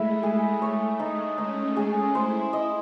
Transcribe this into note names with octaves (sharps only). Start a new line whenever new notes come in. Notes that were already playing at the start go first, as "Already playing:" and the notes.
Already playing: G#3 A3 E4 E5
G#3 G#4
A3 C#5
G#3 D#4
C#4 D#4
G#4
E4 C5
D#5